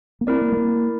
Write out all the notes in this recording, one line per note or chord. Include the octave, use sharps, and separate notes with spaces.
A#3
C4 E4 A#4 D5
A#3
A3
A#3